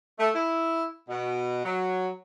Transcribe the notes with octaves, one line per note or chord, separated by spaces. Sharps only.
A3
E4
B2
F#3